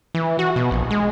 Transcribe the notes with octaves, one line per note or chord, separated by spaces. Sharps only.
E3
F#4
B2
A#1
G#3